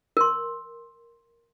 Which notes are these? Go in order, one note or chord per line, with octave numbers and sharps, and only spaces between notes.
A#4 C6